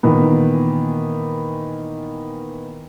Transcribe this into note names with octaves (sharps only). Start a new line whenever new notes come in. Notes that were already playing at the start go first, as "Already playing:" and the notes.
A#2 D#3 E3 B3